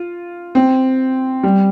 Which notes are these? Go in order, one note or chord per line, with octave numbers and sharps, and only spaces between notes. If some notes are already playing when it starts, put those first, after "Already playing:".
Already playing: F4
C4
G3